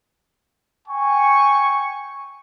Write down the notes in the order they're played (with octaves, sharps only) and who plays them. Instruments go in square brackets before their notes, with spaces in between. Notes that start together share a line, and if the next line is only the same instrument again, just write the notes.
[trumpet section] G5 G#5 C#6